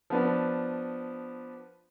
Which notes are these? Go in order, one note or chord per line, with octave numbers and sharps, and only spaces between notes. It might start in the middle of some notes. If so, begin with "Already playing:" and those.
F3 B3 D4